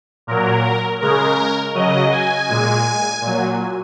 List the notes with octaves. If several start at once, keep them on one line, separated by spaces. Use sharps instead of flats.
A#2 F#3 A#4
C#3 G#3 A#4
C#3 F#3 D#5
G#5
A#2 G#3
A#2 F#3